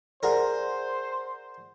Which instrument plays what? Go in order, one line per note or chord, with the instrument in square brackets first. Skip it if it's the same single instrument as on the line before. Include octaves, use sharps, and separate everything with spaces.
[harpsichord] G#4 A#4 [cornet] C5 [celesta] D5 F#5 F6